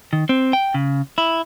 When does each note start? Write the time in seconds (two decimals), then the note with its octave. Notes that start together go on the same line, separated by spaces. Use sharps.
0.13 D#3
0.29 C4
0.53 G5
0.74 C#3
1.18 E4